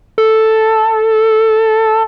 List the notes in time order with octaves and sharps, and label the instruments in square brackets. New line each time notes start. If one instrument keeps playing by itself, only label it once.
[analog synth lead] A4